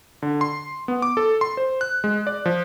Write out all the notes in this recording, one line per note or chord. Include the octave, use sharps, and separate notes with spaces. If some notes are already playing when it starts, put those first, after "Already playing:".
D3
C6
B3
D6
A4
C6
C5
F#6
G#3
D5
F3